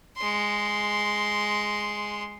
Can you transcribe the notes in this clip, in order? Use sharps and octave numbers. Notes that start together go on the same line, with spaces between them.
G#3 C6